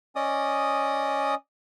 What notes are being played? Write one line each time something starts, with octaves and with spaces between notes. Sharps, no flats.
C#4 D5 D#5 D#6